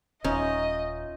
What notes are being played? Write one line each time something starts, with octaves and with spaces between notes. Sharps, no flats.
D#1 C#4 D#4 F4 D#5 E5